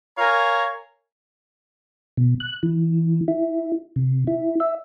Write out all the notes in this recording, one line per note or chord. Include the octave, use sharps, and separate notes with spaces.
A#4 C#5 F5 G#5 A#5
B2
F#6
E3
E4
C3
E4
E5